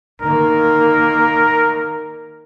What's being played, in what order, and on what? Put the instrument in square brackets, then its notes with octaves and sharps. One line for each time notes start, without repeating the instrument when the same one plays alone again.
[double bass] D#3 A#3 [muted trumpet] A#4